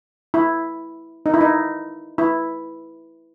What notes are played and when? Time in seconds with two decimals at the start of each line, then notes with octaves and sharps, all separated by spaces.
0.34 E4
1.26 D#4
1.34 E4
1.41 D#4
2.18 E4